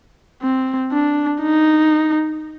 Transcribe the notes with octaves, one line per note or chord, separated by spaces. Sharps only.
C4
D4
D#4